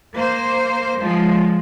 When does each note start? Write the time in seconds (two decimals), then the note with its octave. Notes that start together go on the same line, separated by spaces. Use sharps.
0.14 A#3 C5
0.98 F3 G#3